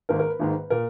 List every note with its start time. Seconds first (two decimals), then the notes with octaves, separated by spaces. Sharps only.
0.09 G#1 G#2 D#3 A#4
0.19 A#4
0.29 B4
0.39 G#1 G#2 D#3
0.70 A#2 A#4